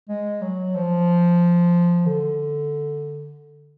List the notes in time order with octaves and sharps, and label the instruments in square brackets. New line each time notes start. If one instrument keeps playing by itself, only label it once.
[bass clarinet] G#3
F#3
F3
D3